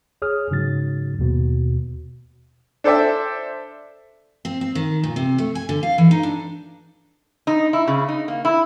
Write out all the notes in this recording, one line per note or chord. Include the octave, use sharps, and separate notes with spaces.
G#4 C#5 D#6 F6
G#2 C#3 F#3 A6
D#2 B2
D4 A4 C5 D5 E5 G5
C4
C4
D#3
A#2
C3
A3
G#5
D3
F5
E3
D#4
D4
D#4
E4
C#3
D#4
A#3
E4